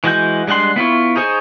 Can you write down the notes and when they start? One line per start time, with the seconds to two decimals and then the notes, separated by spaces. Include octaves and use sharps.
0.04 E3 G#3 F#4 G6
0.47 G3 G#3 D4 F#5 C6
0.76 B3 E4 F4 C#5
1.16 D#4 G#4 C5 C#5